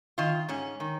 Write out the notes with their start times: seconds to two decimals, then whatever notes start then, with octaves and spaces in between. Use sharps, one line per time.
0.18 D#3 F4
0.49 G#2 C#4
0.80 D#3